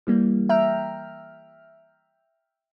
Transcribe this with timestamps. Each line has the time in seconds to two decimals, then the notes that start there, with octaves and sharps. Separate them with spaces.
0.07 E3 G3 A#3
0.49 E5 G5 A#5 F6